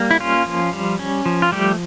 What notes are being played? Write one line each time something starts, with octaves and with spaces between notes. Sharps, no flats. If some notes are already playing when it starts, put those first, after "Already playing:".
Already playing: G3 A#3
E4
C#4 F4
F3
G3
C#4
F3
F4
G3 A3 G4